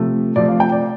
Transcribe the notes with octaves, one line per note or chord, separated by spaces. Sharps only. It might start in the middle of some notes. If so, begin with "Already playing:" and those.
Already playing: C3 F3 A3
C3 F3 A3 D5
F5
G5
D5